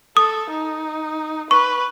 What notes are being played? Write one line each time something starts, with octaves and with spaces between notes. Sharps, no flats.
A4 D#6
D#4
B4 C#6